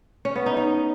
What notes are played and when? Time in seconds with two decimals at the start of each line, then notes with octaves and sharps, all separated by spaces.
0.25 C#4
0.36 B3
0.46 D#4
0.57 D#4